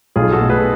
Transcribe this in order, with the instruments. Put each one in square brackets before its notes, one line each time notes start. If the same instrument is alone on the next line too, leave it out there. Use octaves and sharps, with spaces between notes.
[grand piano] B1 [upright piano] F4 G#4
[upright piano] F#4 A4
[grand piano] B2 A3
[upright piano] G#4 B4